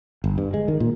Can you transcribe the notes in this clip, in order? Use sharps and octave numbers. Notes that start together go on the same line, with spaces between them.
G1
G2
G#3
D#3
A#2